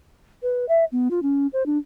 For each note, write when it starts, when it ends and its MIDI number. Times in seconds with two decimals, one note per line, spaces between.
0.43 0.65 71
0.69 0.85 76
0.92 1.08 59
1.11 1.22 65
1.23 1.47 61
1.53 1.65 72
1.66 1.78 62